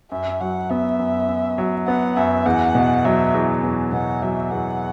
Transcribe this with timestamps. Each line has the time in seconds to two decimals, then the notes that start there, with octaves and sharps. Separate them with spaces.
0.11 F#2 E5
0.41 F#3 F#5
0.70 B3 E5
0.99 F#2
1.28 F#2
1.58 F#3
1.87 B3 F#5
2.17 F#2 E5
2.46 E2 F#5
2.75 B2
3.04 F#3 E5
3.34 E2
3.63 E2
3.92 B2 F#5
4.22 F#3 E5
4.51 E2 F#5